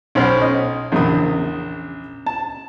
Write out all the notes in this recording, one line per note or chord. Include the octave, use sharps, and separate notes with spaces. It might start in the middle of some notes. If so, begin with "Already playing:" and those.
B1 B2 C#4 C5 F6
D#5
A#1 E2 C#3 D#6
A5